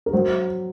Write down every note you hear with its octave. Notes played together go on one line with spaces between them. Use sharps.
A#4
F#3 C5